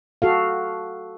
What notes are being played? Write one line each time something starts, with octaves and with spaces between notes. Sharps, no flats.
F#4 A4 F5